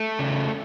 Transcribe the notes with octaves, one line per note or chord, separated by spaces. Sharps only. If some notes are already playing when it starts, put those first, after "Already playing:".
Already playing: A3
C#3